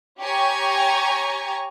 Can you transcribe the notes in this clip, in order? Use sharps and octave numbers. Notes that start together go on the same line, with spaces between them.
G4 C#5 G#5 A#5 C#6